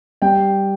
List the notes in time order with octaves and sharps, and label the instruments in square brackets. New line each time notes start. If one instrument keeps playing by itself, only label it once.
[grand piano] G3 G5